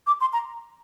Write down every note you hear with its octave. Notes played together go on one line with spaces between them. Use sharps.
D6
C6
A#5